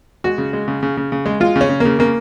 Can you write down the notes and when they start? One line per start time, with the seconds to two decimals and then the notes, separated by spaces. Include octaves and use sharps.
0.24 G#3 F#4
0.38 C#3
0.53 G#3
0.68 C#3
0.83 C#3
0.97 C#3
1.12 C#3
1.26 G#3
1.40 G#3 F4
1.56 C#3
1.61 C#4
1.69 C#3
1.80 C#3 A#3
1.99 C#3 A#3